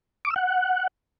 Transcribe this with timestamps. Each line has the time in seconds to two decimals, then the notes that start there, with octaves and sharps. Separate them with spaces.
0.25 D6
0.30 E6
0.36 F#5